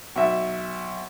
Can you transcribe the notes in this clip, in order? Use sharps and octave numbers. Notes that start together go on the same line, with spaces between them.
B1 E5